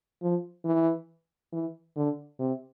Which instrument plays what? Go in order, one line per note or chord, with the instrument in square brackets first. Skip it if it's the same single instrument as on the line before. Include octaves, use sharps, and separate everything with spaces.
[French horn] F3
E3
E3
D3
C3